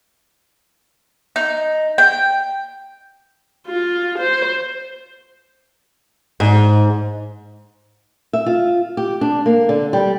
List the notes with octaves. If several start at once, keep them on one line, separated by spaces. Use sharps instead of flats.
D#4
G5
F4
C5
G#2
E5
F4
G4
D4
A#3
D3
G3